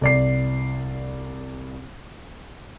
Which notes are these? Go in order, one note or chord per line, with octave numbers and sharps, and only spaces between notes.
C2 D5 C7